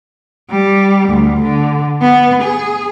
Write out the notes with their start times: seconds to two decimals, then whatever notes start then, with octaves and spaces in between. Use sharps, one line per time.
0.51 G3
1.09 D2
1.43 D3
2.01 B3
2.42 G#4